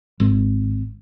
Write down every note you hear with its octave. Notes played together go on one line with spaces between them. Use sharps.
G#1